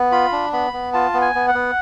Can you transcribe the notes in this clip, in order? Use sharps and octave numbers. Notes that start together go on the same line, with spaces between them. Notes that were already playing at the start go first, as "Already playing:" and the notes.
Already playing: B3
F4 B5
D4
B3 B5
B3
F4 A5
B3
G#5
B3
F#5
B3